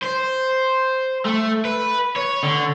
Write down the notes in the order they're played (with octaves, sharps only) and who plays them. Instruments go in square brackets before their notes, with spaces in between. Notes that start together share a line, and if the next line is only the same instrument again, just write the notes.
[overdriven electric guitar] C5
A3
B4
C#5
D3